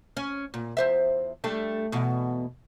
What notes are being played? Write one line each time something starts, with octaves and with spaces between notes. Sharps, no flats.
C#4
A#2
E2 C5 E5
G3 A3 D4
E2 B2